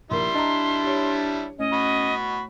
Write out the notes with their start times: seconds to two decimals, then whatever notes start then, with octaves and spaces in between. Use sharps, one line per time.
0.11 A#1 G3 E4 A#4 C6
0.34 D4 D#5 A#5
0.83 G4 C#5
1.59 A2 C#4 D#5
1.73 F#4 B5